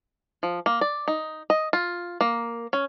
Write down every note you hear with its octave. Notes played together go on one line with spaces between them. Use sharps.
F3
A#3
D5
D#4
D#5
F4
A#3
C#4